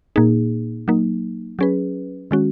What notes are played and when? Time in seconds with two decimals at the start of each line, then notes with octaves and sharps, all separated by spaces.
0.16 A#2 A#3 D#4 G#4
0.88 F#3 A#3 D#4
1.59 F#3 C#4 G#4 B4
2.31 D#3 G#3 C#4 F#4